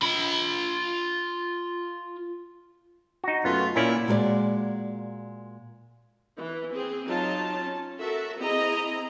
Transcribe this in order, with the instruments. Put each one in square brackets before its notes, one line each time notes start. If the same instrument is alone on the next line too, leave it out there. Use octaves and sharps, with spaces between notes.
[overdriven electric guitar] F4 B5
[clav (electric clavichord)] D#4 F#4
[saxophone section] F#2 A3 F4 [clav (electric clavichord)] B3
[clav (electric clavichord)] A#2 C#4 D5 [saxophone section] A#3 E4
[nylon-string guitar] A#2 G#3 F#4 A#4 D5
[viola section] E3
C4 G#4
F#3 D#4 F4 A5
C#4
F#4 A4 A#4 E5
C4 E4 G#4 D#5 A#5